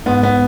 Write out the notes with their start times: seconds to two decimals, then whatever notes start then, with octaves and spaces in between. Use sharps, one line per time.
0.06 G#2 B3
0.23 B3